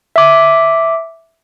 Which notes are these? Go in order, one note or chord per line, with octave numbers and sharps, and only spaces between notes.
E5 D6